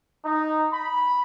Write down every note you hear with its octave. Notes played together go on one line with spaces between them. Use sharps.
D#4
B5